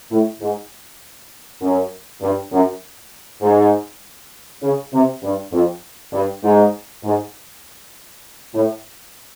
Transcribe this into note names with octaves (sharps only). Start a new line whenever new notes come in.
A2
G#2
F#2
G2
F#2
G#2
C#3
C3
G2
F2
G2
G#2
G#2
A2